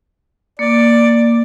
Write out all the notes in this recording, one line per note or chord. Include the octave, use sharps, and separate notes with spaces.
A#3 D5